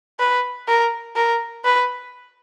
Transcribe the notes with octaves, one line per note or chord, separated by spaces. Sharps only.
B4
A#4
A#4
B4